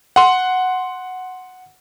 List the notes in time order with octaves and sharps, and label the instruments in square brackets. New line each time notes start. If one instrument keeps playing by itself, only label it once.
[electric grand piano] F#5 C6